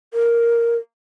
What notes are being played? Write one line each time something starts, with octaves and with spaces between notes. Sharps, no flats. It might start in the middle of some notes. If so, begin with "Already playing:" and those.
A#4